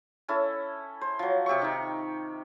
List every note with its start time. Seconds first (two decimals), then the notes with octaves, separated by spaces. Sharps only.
0.28 C#4 E4 A4
1.01 C5
1.19 F3 F#3
1.46 C3 G4 E5 C#6
1.61 D#3 D#4